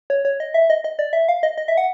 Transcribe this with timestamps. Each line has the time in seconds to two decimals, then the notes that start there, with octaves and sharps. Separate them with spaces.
0.10 C#5
0.25 C#5
0.40 D#5
0.54 E5
0.70 D#5
0.84 D#5
0.99 D5
1.13 E5
1.28 F5
1.43 D#5
1.58 D#5
1.68 E5
1.77 F#5